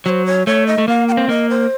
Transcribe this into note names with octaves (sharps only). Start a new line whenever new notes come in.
F#3 C5 C#5
C#5
A3 C#5
D#5
A3
A#3 F5
G5
F5
C4
A#3 D#5
C5